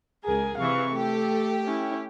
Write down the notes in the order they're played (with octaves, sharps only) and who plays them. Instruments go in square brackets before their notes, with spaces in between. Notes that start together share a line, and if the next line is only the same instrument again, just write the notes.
[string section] C#2 G#4 [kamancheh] A#4 G#5
[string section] C3 E3 [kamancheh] F5 C#6
[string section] A3 G4 [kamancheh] A4
[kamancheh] C#4 E4